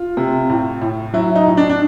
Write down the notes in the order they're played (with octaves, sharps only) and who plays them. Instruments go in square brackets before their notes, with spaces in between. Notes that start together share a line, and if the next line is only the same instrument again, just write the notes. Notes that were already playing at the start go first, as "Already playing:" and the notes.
Already playing: [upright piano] F4
C3
A2
A2
F#3 E4
D#4
A2
D4
D4